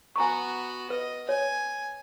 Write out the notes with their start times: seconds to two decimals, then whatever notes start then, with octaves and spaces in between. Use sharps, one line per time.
0.16 B3 F#4 G#5 A#5 C#6
0.90 B4 D#5
1.29 C#5 G#5